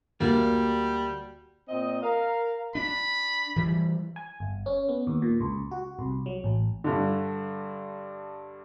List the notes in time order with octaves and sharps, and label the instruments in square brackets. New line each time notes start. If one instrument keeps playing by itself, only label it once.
[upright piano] D2 [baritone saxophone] G3 [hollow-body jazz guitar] A#3
[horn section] A#2 C4 D#5
A#4 F5
[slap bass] D4 [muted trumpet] B5
[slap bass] E3 G3
[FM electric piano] G#5
G1
C#4
B3
D#2
A#2
C#2
F#4
C2
F#3
A1
[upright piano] G2 D3